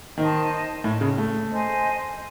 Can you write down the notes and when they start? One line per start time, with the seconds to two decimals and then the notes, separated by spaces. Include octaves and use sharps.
0.18 D#3 C5 D#5 A5
0.84 A2
1.01 C#3
1.18 A3
1.51 C5 D#5 G#5